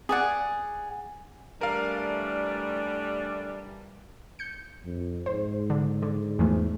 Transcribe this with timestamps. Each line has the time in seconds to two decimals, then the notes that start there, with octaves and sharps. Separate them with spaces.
0.09 G#4 D5 F#5
1.61 E3 G3 A3 D4 A#4 F5
4.39 G6 C#7
4.84 F2
5.26 G#2 C5
5.70 D3
6.02 D3
6.39 E2 E3 F3 A3